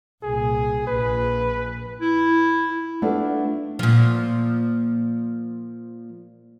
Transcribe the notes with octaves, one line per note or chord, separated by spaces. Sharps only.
C2 A#2 G#4
A#1 B4
E4
A3 B3 D4 E4 F4
A#2 F3